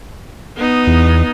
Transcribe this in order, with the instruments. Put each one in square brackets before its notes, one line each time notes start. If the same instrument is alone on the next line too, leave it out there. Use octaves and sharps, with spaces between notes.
[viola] B3 D#4
[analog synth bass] E2